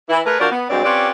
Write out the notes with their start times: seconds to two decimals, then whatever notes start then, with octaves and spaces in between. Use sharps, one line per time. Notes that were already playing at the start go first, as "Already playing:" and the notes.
0.09 E3 E4
0.26 A3 G#4 A#4 B4
0.40 F3 D4 F#4 A#4 C5 D5
0.51 B3
0.69 D2 G2 F#3 G#3 C4 D5
0.84 C4 C#4 F4 G4 B4 D5